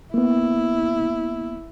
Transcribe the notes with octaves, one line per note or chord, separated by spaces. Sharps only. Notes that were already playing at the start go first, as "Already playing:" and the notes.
A#3 B3 E4